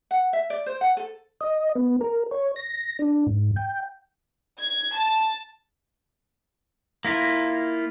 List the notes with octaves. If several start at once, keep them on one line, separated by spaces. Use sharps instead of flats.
F#5
E5
D5
C5
F#5
A4
D#5
B3
A#4
C#5
A#6
D4
G#2
G5
G#6
A5
A#3 E4 F4